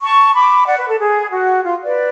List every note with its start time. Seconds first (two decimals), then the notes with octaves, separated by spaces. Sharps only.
0.01 A5 C#6
0.34 B5 D6
0.66 D5 F#5
0.77 B4
0.88 A4
0.99 G#4
1.31 F#4
1.63 F4
1.85 B4 D5